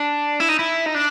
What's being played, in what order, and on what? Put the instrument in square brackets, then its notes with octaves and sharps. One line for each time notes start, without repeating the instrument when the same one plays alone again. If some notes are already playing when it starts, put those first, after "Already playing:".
Already playing: [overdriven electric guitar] D4
E4
D#4
E4
D#4
D4